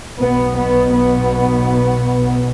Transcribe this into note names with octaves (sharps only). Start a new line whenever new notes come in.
B1 B2 B3
B3
B3